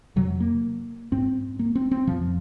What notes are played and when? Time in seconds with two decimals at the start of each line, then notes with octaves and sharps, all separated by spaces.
0.16 F2 C3 F#3
0.40 A#3
1.12 G#2 C4
1.59 A#3
1.75 C4
1.91 C4
2.07 F2 C3 F3